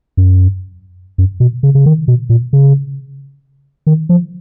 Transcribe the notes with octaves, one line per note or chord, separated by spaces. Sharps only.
F#2
F#2
B2
C#3
C#3
D#3
B2
A#2
C#3
D#3
F3